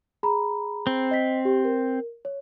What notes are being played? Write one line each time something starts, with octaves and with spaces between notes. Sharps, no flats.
G#4 A#5 B5
C4
D#5 B6
G4
A#4
C#5